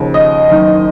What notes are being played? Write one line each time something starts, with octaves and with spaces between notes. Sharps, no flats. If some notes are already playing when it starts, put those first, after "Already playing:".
Already playing: D#2 C#3 F3
D#5
F#1 F#2 D#3